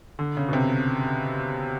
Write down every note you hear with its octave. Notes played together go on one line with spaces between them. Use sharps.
D3
C#3
B2
C3